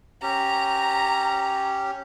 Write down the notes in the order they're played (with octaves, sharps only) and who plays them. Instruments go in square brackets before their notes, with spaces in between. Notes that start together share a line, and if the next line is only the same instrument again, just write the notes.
[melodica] C#4 G4 [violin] A#5